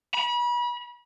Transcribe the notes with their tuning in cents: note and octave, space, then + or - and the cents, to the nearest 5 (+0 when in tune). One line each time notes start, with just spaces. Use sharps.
B5 -35